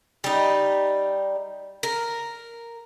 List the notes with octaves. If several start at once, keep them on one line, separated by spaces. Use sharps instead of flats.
G3 D#4
A#4